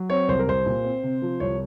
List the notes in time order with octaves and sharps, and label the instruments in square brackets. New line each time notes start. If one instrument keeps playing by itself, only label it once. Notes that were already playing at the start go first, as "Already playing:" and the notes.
Already playing: [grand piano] F#3
C4 C#5
C2 C5
A#4
C2 C5
A#2
C4
C3
F3
C2 C#5